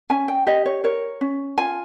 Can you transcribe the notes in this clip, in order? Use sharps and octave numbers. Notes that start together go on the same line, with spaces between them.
C#4 G#5
G5
G4 D#5
C#5
A#4 C#5
C#4
F4 G#5